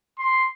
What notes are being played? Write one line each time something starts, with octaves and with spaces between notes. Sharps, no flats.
C6